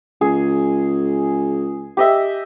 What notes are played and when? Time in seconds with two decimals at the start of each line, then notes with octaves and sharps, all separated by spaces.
0.21 C#2 G#4
1.97 G4 D#5 E5